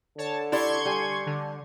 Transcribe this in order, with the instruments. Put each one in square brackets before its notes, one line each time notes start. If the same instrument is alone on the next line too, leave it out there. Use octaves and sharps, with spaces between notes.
[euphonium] D3 [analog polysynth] C#5 A5
[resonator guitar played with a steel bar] E4 G4 D5 [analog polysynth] C6 C#6 G#6
[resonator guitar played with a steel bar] G3 G#5
[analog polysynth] D3